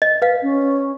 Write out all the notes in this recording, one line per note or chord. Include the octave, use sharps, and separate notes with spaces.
D#5
B4 F5
C#4